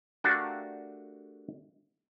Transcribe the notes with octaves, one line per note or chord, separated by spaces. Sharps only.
A3 D4 F#4 G4 A#4 F5